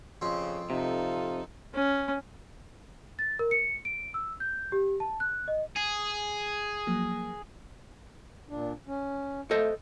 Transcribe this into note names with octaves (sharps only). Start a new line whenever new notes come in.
F2 C#3 C4
C3 D#4 F4 A4
C#4
A6
A#4
C#7
D7
E6
G6
G4
A5
F#6
D#5
G#4
F3 F#3 A#3
A#2 D4
C#4
A3 A4 C5 D#5